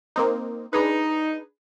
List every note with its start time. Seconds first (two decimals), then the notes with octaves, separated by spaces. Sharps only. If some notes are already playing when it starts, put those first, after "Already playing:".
0.16 A#3 C4 D#4
0.73 D4 D#4 G#4 B4